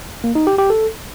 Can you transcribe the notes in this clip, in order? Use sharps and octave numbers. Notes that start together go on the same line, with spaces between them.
A#3
D#4
G4
G4
A4